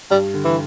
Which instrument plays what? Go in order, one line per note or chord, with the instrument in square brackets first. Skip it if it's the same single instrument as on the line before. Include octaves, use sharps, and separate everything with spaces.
[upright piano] G2 [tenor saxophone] G3
[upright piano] D3
[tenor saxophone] E3